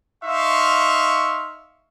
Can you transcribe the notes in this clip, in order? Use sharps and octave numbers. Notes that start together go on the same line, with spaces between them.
D#4 E5 F5 C6 C#6